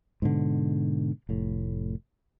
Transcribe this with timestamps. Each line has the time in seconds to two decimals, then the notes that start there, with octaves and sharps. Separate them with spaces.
0.22 G#2 B2 D3
1.29 F1 A2